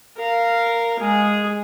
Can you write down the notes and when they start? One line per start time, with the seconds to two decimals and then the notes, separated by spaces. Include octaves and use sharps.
0.18 A#4 F5
1.00 G#3 G#4